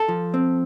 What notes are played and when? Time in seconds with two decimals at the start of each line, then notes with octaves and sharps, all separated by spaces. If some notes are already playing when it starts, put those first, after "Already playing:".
Already playing: A4
0.08 F3
0.34 C4